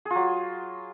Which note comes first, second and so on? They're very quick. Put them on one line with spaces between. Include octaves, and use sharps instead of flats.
G#4 F4 F#3